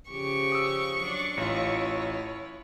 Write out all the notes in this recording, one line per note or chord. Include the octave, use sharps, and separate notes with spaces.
C#3 F3 G4 C#6
D#6 E6
F#3 D4
A1 E4 F4 C#5